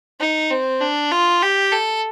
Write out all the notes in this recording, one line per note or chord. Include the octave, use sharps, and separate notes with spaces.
D#4
C4
D4
F4
G4
A4